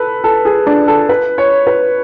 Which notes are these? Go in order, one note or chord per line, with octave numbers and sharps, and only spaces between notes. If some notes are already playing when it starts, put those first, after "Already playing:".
Already playing: A4 B4
A4
G#4
D4
A4
B4
C#5
B4